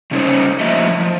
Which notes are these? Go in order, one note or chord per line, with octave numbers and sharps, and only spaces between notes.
C#3 G3 C#4 D#4 C5
A2 F3 A#3 F#4 D#5 E5
F3